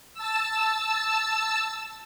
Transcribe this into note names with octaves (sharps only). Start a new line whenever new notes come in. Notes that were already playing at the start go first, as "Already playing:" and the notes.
A5 E6